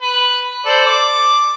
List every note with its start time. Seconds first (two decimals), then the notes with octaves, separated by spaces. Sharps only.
0.02 B4
0.66 A4 C5 D5
0.86 D6